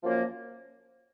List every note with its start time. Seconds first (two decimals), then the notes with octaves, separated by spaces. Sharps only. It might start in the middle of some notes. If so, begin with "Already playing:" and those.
0.02 F#2 F3 A#3